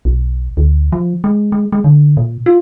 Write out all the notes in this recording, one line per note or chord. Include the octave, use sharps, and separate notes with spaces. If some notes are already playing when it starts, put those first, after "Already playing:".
B1
D2
F3
G#3
G#3
G#3
D3
A#2
F4